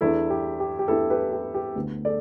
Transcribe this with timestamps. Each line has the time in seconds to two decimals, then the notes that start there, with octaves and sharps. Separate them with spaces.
0.01 E2 E3 B3 D4 E4 A4
0.30 G4
0.60 G4
0.79 G4
0.88 E2 E3 B3 D4 E4 A4
1.10 G4 B4
1.32 G4
1.54 G4
1.76 D2 D3 B3
2.05 A4 D5